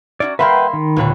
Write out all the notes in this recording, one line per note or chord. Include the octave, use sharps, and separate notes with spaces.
C#4 D#4 F#4 D5
G3 A#3 B4 E5 F#5 G5 B5 C6
D#3
D#2 A#2 D3 F3 B4 C#5